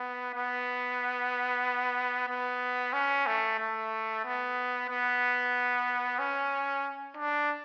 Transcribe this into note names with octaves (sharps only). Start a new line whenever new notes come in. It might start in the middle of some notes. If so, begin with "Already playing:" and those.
Already playing: B3
B3
B3
C#4
A3
A3
B3
B3
C#4
D4